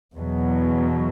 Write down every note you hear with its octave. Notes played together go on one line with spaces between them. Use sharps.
E2 B2 F#3